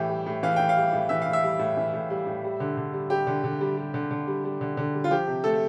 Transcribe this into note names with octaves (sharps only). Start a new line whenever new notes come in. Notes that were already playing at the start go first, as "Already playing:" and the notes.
Already playing: A2 E3 G4
G3
A2
E3 F5
A2 G5
F5
G3
A2
E3 E5
A2 F5
E5
G3
A2
E3
A2
G3
A2
G3
D3
D3
G3
G3 G4
D3
D3
G3
G3
D3
D3
G3
G3
D3
D3
G3
F4
F3 G4
C3
A3 A4